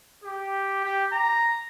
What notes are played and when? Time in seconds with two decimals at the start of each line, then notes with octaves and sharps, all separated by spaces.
0.24 G4
0.84 G4
1.12 A#5